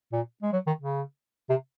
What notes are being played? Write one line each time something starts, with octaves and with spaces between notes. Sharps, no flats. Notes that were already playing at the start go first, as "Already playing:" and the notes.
A#2
G#3
F#3
D#3
C#3
C3